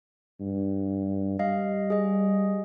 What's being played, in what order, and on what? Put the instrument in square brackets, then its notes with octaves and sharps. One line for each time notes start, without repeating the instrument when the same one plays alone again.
[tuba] G2
[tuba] G3 [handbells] D#5 F5
[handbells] G#4 D#5